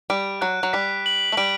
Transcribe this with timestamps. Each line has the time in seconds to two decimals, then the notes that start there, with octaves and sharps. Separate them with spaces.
0.10 G3 D7
0.41 F#3 F#6
0.63 F#3
0.73 G3 B6
1.06 F#7
1.32 A3
1.37 G3 D7